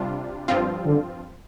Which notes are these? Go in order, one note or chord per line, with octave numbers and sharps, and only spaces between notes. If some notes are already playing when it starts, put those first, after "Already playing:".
Already playing: C3 G3 D4 F4
G2 F3 C4 F4
D3